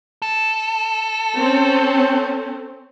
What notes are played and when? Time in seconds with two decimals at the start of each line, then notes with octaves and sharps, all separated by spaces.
0.22 A4
1.36 C4 C#4